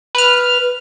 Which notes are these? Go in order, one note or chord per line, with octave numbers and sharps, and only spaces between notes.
B4 F6